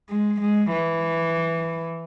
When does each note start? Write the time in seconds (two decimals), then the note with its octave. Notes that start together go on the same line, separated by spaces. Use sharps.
0.10 G#3
0.42 G#3
0.72 E3